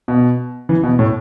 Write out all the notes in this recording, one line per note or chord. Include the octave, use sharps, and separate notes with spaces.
B2
E3
B2
A2